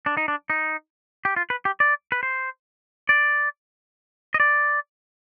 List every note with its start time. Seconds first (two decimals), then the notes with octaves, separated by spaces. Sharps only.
0.06 D4
0.17 D#4
0.28 D4
0.50 D#4
1.25 G4
1.36 F4
1.50 B4
1.65 G4
1.80 D5
2.12 B4
2.23 C5
3.09 D5
4.34 D#5
4.40 D5